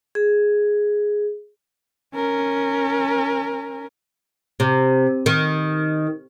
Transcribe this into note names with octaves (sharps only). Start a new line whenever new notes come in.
G#4
C#4 A#4
C3
D#3